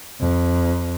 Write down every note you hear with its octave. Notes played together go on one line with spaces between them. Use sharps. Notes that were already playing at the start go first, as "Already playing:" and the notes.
F2